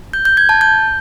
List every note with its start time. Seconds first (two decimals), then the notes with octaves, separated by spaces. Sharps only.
0.13 G6
0.25 G6
0.37 G#6
0.49 A5
0.61 G6